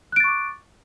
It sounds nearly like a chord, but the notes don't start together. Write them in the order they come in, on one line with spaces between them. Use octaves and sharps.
F#6 D7 A6 C#6 D6